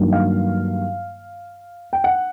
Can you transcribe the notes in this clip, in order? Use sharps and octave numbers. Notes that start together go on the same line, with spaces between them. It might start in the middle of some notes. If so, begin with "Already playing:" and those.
Already playing: G2 D#3 F#3 A#3
F5
G5
F#5